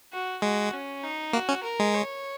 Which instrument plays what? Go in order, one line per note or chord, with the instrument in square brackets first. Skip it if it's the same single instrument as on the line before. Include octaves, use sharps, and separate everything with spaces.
[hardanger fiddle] F#4
[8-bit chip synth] G#3 [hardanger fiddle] F#4
[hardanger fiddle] C#4
D#4
[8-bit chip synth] A#3 [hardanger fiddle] F#4
[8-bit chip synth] C#4
[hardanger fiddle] A#4
[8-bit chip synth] G#3
[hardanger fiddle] C#5